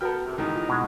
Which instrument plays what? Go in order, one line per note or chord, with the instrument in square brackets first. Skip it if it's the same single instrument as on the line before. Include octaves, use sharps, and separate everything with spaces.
[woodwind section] B3 [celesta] F#4 F6 [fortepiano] A4 A#4 G5
[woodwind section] E2 C3
[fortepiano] C#2 D#3 E3 [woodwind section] D#4
[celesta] F4
[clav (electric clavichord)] B2 G#3